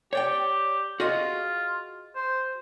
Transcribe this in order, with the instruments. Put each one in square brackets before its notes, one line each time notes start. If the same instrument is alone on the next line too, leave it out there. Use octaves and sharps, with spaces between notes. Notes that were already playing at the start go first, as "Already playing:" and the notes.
[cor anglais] G4 [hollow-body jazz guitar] C#5 D5 G5
[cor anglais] F4 [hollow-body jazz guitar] F#4 G#4 D#5
[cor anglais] C5